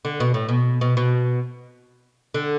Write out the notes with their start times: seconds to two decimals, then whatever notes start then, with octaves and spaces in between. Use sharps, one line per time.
0.05 D3
0.20 B2
0.34 A2
0.49 B2
0.81 B2
0.97 B2
2.34 D3